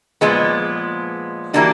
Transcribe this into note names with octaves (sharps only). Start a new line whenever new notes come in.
A#2 F3 G#3 B3
E3 G3 A#3 D4 F#4